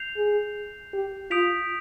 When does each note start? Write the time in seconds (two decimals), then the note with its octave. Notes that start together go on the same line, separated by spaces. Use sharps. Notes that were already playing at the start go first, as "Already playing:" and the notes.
Already playing: G6 C7 F7
0.17 G#4
0.93 G4
1.31 F4 D#6 G6 B6 D7 F7